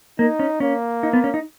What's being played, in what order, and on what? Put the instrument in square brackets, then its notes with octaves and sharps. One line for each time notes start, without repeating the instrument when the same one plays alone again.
[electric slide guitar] A#3 [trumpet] D#4
[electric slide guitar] C#4
[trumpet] A#3 [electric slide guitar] C#4
[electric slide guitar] D#4
B3
C#4
D#4